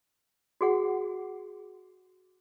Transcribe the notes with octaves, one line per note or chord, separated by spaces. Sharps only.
F#4 G#4 F#5